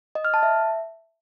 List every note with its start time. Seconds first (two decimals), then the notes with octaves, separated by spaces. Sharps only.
0.15 D#5
0.25 F6
0.34 A5
0.43 E5